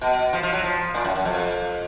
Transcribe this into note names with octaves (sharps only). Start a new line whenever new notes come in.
B2
F3
F3
F#3
F3
A#2
F#2
F#2
F2